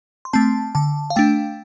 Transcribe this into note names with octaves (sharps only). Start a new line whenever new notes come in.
C6
A3 C4 A5
D3 A5
F5
A3 D4 G5